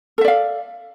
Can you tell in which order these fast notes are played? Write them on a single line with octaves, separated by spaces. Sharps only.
A4 E5 D5 F5